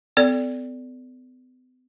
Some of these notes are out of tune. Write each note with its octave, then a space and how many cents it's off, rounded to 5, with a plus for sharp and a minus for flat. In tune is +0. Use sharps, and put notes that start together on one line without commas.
B3 +45 A4 +0 D5 -10